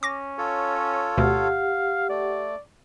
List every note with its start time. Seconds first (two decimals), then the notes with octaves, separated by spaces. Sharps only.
0.03 C#4 D6 A#6
0.38 F4 A4 C#5
1.18 G#1 D2 B2 G4 F5 F#5
2.10 A3 D5